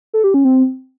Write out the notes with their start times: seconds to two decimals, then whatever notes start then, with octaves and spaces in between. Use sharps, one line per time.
0.14 A4
0.24 G4
0.34 C#4
0.45 C4